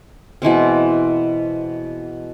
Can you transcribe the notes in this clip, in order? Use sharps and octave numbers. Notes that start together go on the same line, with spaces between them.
B2 E3 G#3 C4